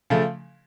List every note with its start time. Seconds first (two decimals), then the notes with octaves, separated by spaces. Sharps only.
0.10 C#3 F3 A3